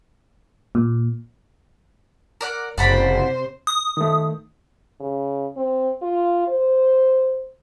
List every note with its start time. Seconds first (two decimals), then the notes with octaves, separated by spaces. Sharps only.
0.75 A#2
2.41 A#4 D5 F#5
2.78 F#1 C3 C5 D5 F#5 B5
3.67 D#6
3.97 D#3 A3
5.00 C#3
5.56 C4
6.02 F4
6.48 C5